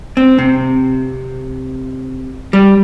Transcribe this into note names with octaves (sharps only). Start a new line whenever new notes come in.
C4
C3
G3